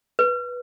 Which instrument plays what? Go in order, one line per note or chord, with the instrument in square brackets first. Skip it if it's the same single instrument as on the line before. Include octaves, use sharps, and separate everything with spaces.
[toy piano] B4